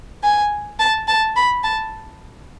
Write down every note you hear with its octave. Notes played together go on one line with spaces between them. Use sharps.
G#5
A5
A5
B5
A5